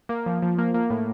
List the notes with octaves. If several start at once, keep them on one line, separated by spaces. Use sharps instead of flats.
A#3
F3
F3
A#3
A#3
A2